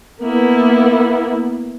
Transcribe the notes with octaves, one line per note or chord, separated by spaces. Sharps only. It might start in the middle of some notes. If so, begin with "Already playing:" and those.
A#3 B3 E4